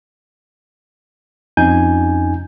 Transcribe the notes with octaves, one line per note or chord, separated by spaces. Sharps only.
F2 C#4 D#4 G#5 G6